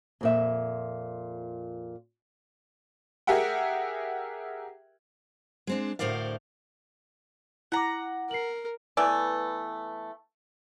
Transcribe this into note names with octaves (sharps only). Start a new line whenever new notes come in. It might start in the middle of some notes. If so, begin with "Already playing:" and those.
F2 A#2 E5
G4 G#4 A#4 E5 F#5 G5
G#3 C4 D4
D2 A2 A#4 C5 D5 F5
E4 F#5 A#5 D6
A#4 C7 F#7
E3 A3 B3 D5